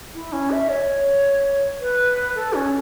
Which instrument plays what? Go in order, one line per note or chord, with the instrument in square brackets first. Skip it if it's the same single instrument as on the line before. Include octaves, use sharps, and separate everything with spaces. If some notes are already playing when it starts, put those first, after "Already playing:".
[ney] E4
C#4
E5
C#5
B4
A4
C#4